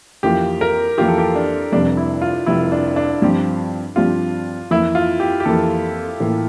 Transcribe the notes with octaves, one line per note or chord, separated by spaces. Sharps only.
F2 E3 A#3 F4 G4
A#4
F2 E3 A#3 F4 G4
A4
G4
D4
F1 F2 C3 G3 D4
E4
F4
F1 F2 C3 G3 E4
D4
D4
G2 F3 C4 G4
G2 F3 C4 F4 G4
F2 E3 A#3 E4
F4
G4
G4
F2 E3 A#3 A4
A2 E3 A#3